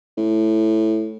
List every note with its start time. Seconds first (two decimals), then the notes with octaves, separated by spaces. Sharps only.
0.17 A2